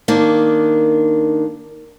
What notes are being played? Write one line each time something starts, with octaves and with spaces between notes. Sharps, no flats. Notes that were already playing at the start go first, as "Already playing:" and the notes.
D#3 A#3 D4